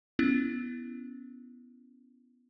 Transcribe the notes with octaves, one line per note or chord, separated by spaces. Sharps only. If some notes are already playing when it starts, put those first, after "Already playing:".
B3 C#4 E4